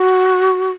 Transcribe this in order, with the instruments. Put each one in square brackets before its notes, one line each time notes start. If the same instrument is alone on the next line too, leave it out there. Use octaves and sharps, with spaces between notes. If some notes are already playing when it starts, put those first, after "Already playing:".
Already playing: [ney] F#4